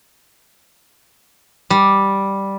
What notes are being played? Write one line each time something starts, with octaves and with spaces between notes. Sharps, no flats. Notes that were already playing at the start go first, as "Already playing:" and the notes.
G3